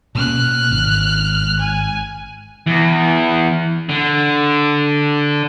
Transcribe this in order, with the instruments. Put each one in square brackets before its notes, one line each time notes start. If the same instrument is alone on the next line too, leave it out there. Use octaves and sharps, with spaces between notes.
[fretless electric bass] B2 A#3 C#4 [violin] F6 F#6
[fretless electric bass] G#1
[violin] G#5
[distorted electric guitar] E2
D3